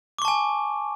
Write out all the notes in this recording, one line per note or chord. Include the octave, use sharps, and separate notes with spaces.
G#5 A5 C#6 D6